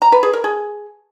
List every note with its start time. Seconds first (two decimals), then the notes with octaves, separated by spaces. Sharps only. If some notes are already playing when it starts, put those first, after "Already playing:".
0.02 A#5
0.12 B4
0.23 G#4
0.33 A#4
0.44 G#4